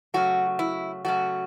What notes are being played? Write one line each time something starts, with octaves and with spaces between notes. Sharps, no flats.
C#3 F#3 A3 F#4
E4
C#3 F#3 A3 F#4